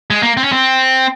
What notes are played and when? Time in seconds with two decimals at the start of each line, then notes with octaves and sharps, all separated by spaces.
0.10 G#3
0.23 A#3
0.37 C4
0.44 C#4
0.52 C4